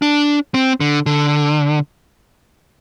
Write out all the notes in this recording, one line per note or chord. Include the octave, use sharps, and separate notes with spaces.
D4
C4
D3
D3